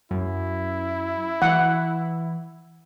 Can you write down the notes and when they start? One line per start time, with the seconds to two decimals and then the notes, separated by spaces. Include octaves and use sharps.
0.11 F#2 E4
1.42 E3 F#5